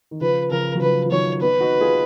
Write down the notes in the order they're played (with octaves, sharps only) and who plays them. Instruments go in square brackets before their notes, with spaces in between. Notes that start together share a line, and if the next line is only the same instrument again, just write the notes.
[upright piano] D#3
[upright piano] C#3 F3 [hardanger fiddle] B4
[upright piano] C#3 F3 [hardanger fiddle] A#4
[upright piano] F#3
[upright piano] C#3 F3 [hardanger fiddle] B4
[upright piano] F3
[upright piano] D#3 F#3 [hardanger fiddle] C#5
[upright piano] B3 D#4 [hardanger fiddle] B4
[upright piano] D#4 F#4
F4 G#4